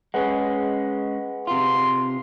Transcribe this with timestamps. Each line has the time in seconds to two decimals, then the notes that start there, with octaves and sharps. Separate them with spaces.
0.14 G#3 C#4 G#4 B4 F#5
1.47 C3 F4 C6